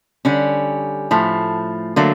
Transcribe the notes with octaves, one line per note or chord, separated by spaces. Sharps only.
D3 G3 C#4
A2 F3 A3
D3 F#3 A3 A#3